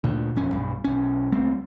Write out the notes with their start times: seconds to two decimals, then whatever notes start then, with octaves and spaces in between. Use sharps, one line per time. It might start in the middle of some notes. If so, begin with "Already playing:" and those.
0.04 D2 A#2
0.36 E1 F2 C#4
0.52 B1 G2
0.84 B1 C#4
1.32 C#2 G3 A3 C4